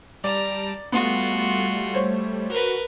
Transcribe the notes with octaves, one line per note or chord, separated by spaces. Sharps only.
G3 D5 A5 A#5 D7
G3 A3 B3 F4 F#4 C6
C5 C#5
F#4 A#4 B4